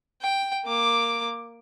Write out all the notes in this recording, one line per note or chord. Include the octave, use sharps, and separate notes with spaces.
G5
A#3 D6